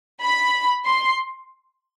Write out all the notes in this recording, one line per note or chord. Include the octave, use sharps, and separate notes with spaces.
B5
C6